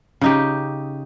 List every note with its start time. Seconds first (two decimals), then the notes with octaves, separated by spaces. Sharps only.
0.21 C#3 D#4 G4